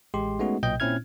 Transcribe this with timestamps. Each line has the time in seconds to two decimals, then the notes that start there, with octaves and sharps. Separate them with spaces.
0.14 A1 G#3 G4 C6
0.39 G#3 A3 B3 C#4 D#4 F#4
0.63 B1 A#2 D#5 G5 G6
0.80 A#2 C4 C#4 E4 F6 G#6